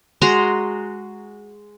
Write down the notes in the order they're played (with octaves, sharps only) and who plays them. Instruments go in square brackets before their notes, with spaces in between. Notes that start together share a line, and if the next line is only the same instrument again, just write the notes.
[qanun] G#3 F#4 A#5 C6